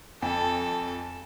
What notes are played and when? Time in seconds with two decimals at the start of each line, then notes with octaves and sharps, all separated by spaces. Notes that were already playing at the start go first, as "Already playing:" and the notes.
0.22 F2 A4 G#5